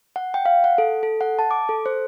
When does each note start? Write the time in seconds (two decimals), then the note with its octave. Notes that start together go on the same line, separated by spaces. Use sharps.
0.16 F#5
0.34 G5
0.45 F5
0.64 F#5
0.78 A4
1.03 A4
1.21 F#5
1.39 A5
1.51 D6
1.69 A4
1.86 C5